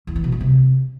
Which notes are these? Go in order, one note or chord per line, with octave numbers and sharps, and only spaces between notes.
E2
E3
B2
G2
C3